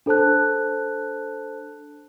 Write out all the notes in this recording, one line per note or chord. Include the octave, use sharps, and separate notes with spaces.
D4 A4 C5 A5 F#6